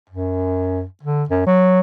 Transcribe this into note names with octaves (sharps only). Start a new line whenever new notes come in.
F#2
D3
F#2
F#3